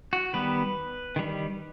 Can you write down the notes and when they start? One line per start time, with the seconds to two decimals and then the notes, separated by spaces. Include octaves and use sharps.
0.13 F#4
0.33 D#3 G3 B3 B4
1.16 D#3 G3